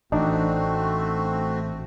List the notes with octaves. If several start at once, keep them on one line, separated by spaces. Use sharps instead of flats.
A1 A3 C4 D4 D#4 F#4